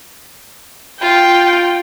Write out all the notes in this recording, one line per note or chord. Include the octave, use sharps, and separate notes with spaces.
F4 G5